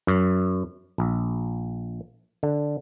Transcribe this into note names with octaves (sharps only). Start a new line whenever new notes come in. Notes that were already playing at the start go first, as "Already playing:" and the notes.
F#2
A#1
D3